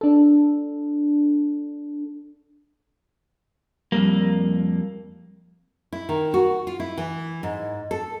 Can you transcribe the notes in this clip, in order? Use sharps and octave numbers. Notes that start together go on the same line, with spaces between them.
D4 A4
F2 G#2 G3 A#3
E4
D#3
F#4
F4
E4
E3
G#2
A4